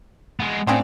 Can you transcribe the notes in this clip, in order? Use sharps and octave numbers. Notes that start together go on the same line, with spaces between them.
G#3 B3
A2 C4 D4 F4 G4 G#4